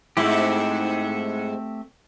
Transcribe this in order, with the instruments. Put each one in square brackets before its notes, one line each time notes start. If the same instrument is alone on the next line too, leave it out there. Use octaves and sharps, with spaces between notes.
[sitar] G#2 E4 [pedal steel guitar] A3 C4 G4